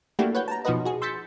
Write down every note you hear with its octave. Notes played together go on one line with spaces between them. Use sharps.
A3 A#3 D4 E4 F#4 G4
B4 C#5 F#5 G6
A5 A#5
B2 F3 D#4 F#4 B4 D#5
F#4 G#4
C6 E6 G6 A6 B6 C#7